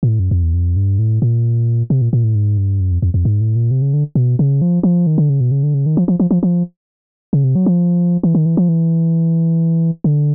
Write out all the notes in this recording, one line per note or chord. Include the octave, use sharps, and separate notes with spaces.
A#2
A2
F#2
F2
E2
F2
G2
A2
A#2
C3
A#2
A#2
A2
G#2
G2
F#2
F2
F2
F2
G#2
A2
A#2
C3
C#3
D3
B2
C#3
F3
F3
D#3
D3
C#3
B2
C#3
D3
C#3
D#3
F3
F3
F3
F3
F3
C#3
C3
F#3
F3
E3
D#3
E3
F3
E3
D3